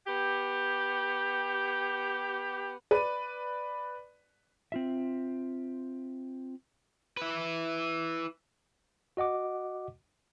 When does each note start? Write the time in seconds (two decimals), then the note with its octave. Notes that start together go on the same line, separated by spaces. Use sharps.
0.07 B3 G4
2.91 B4 D5 D#7
4.72 C4 F4 E5
7.17 E4 B4
9.17 F#4 D#5 F#5 D6